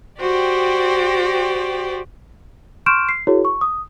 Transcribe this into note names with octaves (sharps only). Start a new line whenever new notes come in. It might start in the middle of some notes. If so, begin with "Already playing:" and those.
F#4 G4 C5 D5 G5
C6 C#6 F6 G6 D7 E7
C7
E4 F#4 G#4 A#4 C#5
C#6
D#6